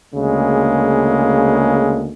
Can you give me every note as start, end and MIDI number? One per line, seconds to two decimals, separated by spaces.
0.15 2.12 38
0.15 2.12 49
0.15 2.12 56
0.15 2.12 58